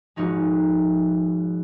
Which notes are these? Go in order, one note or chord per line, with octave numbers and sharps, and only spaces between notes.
G#1 G#2 F3 G#3 D#4 F#4